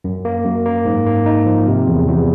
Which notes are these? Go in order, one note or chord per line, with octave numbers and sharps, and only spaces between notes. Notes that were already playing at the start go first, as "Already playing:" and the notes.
F#2
A#3
F#2
A#3
G#2
A#3
D#4
F3
C3
E2
E2